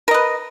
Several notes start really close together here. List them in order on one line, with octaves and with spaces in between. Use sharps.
A#4 D#5 B4